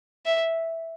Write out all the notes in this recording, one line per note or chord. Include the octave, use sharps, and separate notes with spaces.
E5